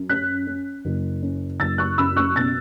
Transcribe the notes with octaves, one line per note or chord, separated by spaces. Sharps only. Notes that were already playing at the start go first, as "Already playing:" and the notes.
Already playing: F#2
C#4 F#6 B6
C#4
F#1
C#4
F#1 E6 A6
C#6 F#6
F#2 B5 E6
C#6 F#6
B2 E6 A6